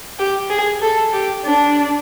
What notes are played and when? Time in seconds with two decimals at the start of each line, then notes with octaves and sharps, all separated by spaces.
0.19 G4
0.50 G#4
0.82 A4
1.13 G4
1.45 D4